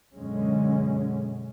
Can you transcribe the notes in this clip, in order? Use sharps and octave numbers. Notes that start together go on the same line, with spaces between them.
F#2 B2 D3 G#3 C#4